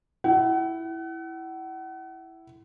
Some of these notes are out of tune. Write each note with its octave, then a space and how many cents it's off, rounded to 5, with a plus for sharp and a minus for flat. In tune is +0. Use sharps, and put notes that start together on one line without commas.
E4 +0 F#5 +35